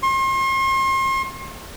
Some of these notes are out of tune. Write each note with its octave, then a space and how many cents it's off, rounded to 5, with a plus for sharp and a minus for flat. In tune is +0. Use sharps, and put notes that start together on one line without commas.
C6 +40